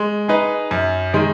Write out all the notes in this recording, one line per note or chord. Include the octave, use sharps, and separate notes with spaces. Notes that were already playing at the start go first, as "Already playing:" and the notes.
Already playing: G#3
D#4 G#4 B4
F#2
D#3 G#3